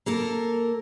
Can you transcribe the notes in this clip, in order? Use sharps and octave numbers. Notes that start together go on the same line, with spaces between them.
A#3 A4 A#4